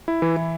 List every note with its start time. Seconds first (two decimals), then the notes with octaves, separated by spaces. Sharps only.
0.08 E4
0.22 E3
0.37 E3